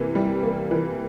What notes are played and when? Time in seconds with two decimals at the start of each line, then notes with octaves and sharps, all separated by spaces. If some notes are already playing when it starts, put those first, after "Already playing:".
Already playing: C3 E3 A#3
0.15 G3
0.43 A#3
0.71 E3